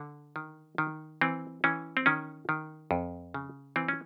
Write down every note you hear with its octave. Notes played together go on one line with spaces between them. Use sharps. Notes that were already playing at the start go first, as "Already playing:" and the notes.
Already playing: D3
D#3
D#3
E3 C4
E3 C#4
C4
D#3 C#4
D#3
F2
C#3
E3 C4
C#4